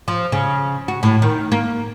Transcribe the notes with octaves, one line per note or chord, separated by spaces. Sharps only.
F3
C#3
F#4
A2
D#3
A#3